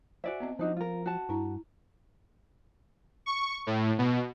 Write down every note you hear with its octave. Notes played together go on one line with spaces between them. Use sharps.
F#4 C5 D5 E5 G#5
B3 C4 D#5
F3 D4 D#4 F#4
F4 A#4
F#4 A5
G2 E4 A#5
C#6
A2
B2